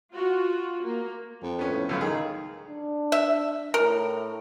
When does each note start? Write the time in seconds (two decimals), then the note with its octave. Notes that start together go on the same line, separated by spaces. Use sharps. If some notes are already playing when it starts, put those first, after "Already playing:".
0.14 F4 F#4
0.84 A#3
1.43 F2
1.59 B3 C#4
1.70 A2
1.89 C#2 F#2 C#3
2.01 D#3 G#4
2.68 D4
3.12 E5
3.74 A2 A#4